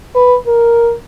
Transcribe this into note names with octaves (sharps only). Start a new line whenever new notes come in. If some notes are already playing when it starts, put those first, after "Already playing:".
B4
A#4